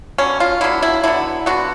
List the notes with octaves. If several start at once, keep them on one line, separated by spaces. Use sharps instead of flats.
D3 F#3 B3 C#4
F4
D3 F#3 B3 E4
E4
D3 F#3 B3 E4
D3 F#3 B3 F#4